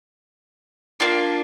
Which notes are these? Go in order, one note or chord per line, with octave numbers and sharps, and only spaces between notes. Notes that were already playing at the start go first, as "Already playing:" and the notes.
A#3 D4 F4